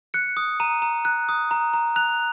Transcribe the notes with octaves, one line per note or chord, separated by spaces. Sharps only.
F#6 C#7
D#6
A#5 D#7
A#5
F#6
D#6
A#5
A#5
F#6 F7